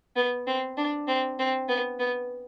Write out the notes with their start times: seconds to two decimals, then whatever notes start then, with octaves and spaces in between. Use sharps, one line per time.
0.16 B3
0.47 C4
0.77 D4
1.08 C4
1.39 C4
1.68 B3
1.99 B3